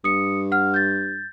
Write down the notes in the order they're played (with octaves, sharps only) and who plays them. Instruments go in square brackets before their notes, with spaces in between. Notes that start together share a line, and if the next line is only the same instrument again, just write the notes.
[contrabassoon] G2 [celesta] D#6 C#7
[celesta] F#5 F6
G6 A6